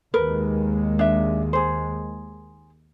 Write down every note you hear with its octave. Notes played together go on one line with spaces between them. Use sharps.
D#2 G#3 A#4 B4
D4 E5
G#4 C5